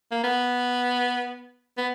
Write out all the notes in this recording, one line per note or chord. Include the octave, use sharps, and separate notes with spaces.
A#3
B3
B3